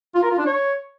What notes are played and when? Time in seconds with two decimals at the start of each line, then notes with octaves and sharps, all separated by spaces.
0.15 F4
0.23 A#4
0.31 F4
0.38 D4
0.46 C#5